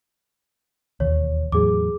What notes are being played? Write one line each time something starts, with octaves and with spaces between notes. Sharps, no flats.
E1 D#2 C#5
E2 A2 F#3 G#4 D6